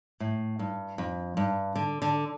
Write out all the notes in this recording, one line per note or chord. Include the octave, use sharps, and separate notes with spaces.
A2
G2
F2
G2
D3
D3